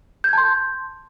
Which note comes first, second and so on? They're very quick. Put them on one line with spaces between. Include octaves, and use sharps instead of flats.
G6 G#6 A5 C6